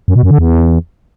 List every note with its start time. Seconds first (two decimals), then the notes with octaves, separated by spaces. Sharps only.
0.08 F#2
0.16 B2
0.23 F#2
0.31 D3
0.38 E2